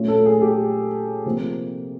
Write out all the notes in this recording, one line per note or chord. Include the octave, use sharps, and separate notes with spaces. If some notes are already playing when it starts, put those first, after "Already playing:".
Already playing: A#2 F#3 A3 C#4
A4
G#4
G4
C3 F3 A#3